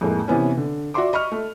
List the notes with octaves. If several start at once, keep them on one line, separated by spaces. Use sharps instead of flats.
F2 A2 G#3 A#3
C3 E3 B3 C#4
D3
F#4 D5 E5 C6 D6
D#5 B5 C#6 F6
A3